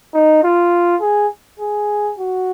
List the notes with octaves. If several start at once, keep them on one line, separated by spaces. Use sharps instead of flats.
D#4
F4
G#4
G#4
F#4